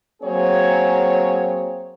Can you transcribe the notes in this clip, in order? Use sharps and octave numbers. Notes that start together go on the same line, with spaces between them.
F#3 A#3 C4 G#4 C#5